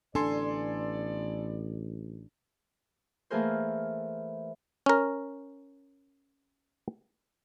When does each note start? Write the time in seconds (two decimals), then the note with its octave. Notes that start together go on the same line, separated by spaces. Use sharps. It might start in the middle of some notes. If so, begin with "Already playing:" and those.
0.15 A1 B3 D4 A4 B4 D5 G#5 C6
3.30 E3 A3 A#3 G#4 A#4 C5
4.86 C#4 A#4